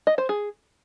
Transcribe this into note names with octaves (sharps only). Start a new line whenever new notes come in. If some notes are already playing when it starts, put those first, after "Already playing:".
D#5
C5
G#4